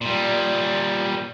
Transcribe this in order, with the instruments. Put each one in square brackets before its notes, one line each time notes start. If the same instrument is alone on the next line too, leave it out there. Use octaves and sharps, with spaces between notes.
[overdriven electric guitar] A#2 G3